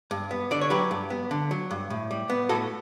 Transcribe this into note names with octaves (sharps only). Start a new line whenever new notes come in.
G2
B3
D3 D5
C#5
F#3 G4 B4
G2
B3
D3
F#3
G2
A2
G3
B3
A2 F#4 A4